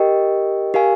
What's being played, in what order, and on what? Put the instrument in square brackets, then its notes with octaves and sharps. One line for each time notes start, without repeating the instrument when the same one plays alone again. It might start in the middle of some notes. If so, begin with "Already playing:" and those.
Already playing: [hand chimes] G4 A#4 D#5 G5
G4 A#4 F5 G#5